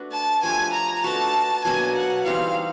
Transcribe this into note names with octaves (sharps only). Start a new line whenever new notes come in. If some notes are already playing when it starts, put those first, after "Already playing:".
Already playing: A3 D4 F#4 B4
A5
F3 A3 D4 G4 G#5
A#5
A3 D4 F#4 B4 A5
B2 F#3 A#3 D4 G#5
F#5
E3 G3 C4 D#4 F5